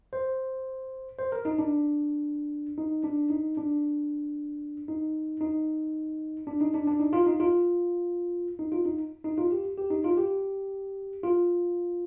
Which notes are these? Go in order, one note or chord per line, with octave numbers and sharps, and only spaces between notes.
C5
C5
A#4
D#4
D4
D#4
D4
D#4
D4
D#4
D#4
D4
D#4
D4
D4
D#4
F4
D#4
F4
D#4
F4
D#4
D#4
F4
G4
G4
D#4
F4
G4
F4